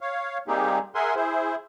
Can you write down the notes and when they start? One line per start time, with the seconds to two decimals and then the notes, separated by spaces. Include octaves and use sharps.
0.01 C#5 F5
0.48 G3 A#3 C4 D#4 G4 G#4
0.95 G#4 A#4 E5 F#5 G#5 C6
1.16 E4 G#4 C5